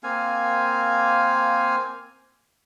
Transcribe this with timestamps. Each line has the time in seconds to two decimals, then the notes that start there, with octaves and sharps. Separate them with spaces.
0.04 A#3 C4 F5 G#5